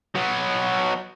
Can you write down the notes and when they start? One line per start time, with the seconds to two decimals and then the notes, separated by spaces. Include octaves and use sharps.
0.15 F#3 B3